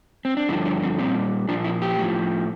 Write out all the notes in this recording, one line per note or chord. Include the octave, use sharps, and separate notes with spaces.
C4
D4
G2 D3 F3 E4
D4
C4
A#2 G3 C4
A#2 F3 D4
E4
G4
A2 F3